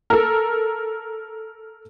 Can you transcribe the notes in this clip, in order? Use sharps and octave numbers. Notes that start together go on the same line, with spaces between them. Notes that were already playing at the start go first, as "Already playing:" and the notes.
A4 A#4